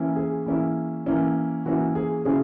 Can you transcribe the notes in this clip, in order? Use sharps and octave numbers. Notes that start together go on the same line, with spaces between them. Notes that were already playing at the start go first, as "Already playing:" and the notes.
Already playing: E3 A#3 C#4 E4
G#4
E3 A#3 C#4 E4
E3 A#3 C#4 E4
E3 A#3 C#4 E4 F#4
G#4
C#3 F#3 C#4 E4 G#4